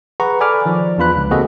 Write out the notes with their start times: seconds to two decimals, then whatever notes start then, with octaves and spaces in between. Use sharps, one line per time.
0.20 G#4 B4 F#5 A#5 C#6
0.40 A4 D5 G#5 B5 D6 F6
0.65 D#3 F3 D5
0.98 E2 D4 F4 B4 B5 F#6
1.16 C#2
1.31 A#3 C4 F#4 G#4 A4 D#5